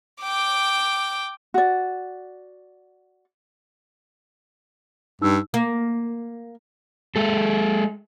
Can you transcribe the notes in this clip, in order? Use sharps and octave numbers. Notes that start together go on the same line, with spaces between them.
G5 D6
F#4 D5
G2 D#4 E6
A#3
G#3 A4